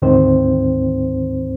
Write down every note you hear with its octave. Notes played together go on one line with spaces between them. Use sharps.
D2 G#2 D#3 C4 C5